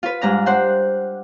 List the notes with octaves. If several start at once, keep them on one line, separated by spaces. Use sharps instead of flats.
F4 B4
G#2 G3 D4 A#5 F6
D4 C5 F#5 G5